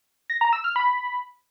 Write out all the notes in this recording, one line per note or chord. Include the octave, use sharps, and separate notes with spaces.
A#6
A#5
E6
F6
B5